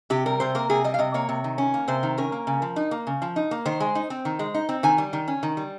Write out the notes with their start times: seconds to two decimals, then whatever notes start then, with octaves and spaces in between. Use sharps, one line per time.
0.10 C3 G4
0.26 G3 A#4
0.40 C3 C5
0.55 A#3 A#4
0.69 C3 G#4
0.84 G3 D#5
0.94 F5
0.99 C3 D#5
1.14 A#3 C#5
1.29 C3
1.44 D#3
1.58 C#4
1.74 A#3
1.88 C3 C5
2.03 D#3
2.18 C#4 A#4
2.32 A#3
2.47 C#3
2.62 F3
2.76 D#4
2.91 A#3
3.07 C#3
3.22 F3
3.36 D#4
3.51 A#3
3.65 D#3 C5
3.80 G#3
3.95 D#4
4.10 C4
4.25 D#3
4.39 G#3
4.54 D#4
4.69 C4
4.83 D#3 G#5
4.98 G3
5.13 D#3
5.28 C#4
5.43 D#3
5.57 G3